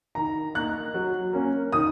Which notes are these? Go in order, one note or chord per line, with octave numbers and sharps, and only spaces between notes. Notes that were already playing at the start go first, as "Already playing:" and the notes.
D#3 A#5
A#3 D#4 F#6
F#3
A#3 C#4
D#3 D#6